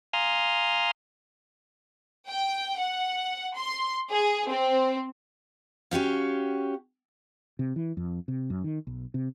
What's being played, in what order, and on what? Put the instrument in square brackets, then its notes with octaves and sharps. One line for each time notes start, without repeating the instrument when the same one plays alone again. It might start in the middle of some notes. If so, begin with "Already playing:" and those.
[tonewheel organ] F5 G#5 A#5 C6 D#6 F6
[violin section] G5
F#5
C6
G#4
C4
[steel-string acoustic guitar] C#4 F#4 G4 F5
[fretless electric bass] C3
E3
F2
C3
F#2
D#3
B1
C3